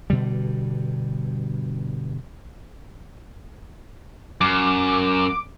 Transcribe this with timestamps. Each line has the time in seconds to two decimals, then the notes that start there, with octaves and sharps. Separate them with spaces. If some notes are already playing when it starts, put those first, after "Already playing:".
0.10 G2 B2 D3 G3
4.41 F#2 D6